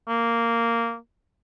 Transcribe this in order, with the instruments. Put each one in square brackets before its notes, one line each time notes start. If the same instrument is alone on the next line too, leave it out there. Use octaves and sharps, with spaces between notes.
[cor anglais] A#3